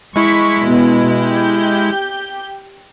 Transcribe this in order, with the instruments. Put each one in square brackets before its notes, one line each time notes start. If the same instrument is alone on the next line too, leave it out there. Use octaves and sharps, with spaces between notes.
[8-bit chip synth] G#3 E4 [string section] C#6 B6
[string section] B2
G4 G6